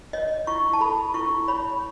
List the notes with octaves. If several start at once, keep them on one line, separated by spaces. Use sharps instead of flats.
C#5 D#5
E4 C#6
A5
A4 B5
E4 C#6
C#5 B5